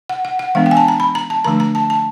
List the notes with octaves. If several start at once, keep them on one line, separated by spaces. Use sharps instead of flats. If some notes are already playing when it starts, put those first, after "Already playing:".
F#5
F#5
F#5
E3 G#3 B3 D4 F5
G5
G#5
A5
A#5
B5
A#5
A5
D3 F3 A3 D4 A#5
A#5
A5
A5